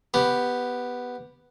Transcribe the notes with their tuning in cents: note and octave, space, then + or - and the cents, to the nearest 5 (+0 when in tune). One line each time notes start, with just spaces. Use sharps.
B3 +0 G4 +0